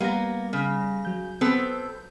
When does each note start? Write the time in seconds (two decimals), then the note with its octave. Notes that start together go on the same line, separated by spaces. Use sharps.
0.01 G3 A#3 B3 A#6
0.53 C#3
1.05 F#3 G6
1.41 B3 C4 A4